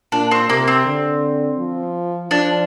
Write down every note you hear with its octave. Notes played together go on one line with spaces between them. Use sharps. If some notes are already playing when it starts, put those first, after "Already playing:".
A#2 D4
C4
C3 A#3
C4
D3
F3
F3 D4